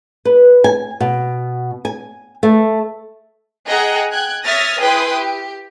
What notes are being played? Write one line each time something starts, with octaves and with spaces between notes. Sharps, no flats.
B4
G#5
B2
G#5
A3
G#4 D#5 F#5 G5 A#5 F#6
G5 F#6 G#6
C#5 E5 D#6 F6 A6 A#6
E4 G#4 B4 G5 C6 D#6
G4